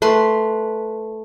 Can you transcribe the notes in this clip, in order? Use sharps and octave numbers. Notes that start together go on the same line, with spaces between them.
A3 B4 C6